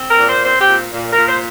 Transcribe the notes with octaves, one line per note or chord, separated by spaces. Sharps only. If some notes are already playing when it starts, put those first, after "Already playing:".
Already playing: C4
A#4
A#2
C5
C4 C5
G4
A#2
A#2
A#4
A#2
C5